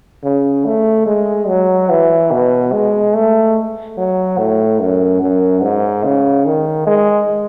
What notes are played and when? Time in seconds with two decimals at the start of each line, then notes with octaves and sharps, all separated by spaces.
0.24 C#3
0.66 A3
1.06 G#3
1.48 F#3
1.90 E3
2.31 B2
2.73 G#3
3.14 A3
3.97 F#3
4.38 A2
4.80 F#2
5.21 F#2
5.63 G#2
6.04 C#3
6.45 D#3
6.87 G#3